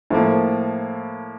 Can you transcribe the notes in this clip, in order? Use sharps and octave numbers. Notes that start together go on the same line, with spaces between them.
A2 F3 A#3